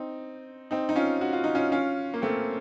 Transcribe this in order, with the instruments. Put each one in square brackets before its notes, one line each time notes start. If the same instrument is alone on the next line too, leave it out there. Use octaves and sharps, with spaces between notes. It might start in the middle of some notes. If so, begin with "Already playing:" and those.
Already playing: [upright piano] C4 D#4
C4 D#4
D#4
C#4 F4
F#4
F4
D#4
C#4 F4
C#4 F4
A#3
A3 C4